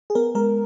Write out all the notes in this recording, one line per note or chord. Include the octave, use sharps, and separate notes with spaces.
G#4
B3 A#4
G#3 A#4